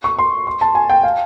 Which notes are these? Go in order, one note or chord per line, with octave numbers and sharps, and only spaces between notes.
C#6
C6
C6
A5
G#5
G5
F5